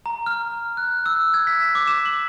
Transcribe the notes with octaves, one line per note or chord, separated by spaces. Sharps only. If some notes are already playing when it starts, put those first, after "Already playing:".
A#5
F6
F#6
E6
G#6
B6
D6
E7
F#7